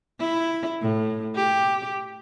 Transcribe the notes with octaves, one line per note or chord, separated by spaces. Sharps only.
E4
A2
G4